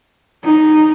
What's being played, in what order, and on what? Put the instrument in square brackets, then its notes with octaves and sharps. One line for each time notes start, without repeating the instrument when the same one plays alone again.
[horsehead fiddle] D#4